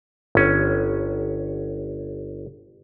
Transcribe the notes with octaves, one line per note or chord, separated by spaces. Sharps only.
G1 C#4